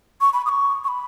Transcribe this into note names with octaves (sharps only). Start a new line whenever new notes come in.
C#6
B5
D#6
C#6
C#6
B5